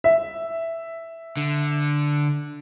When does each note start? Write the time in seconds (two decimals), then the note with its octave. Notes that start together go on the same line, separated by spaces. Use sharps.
0.04 E5
1.37 D3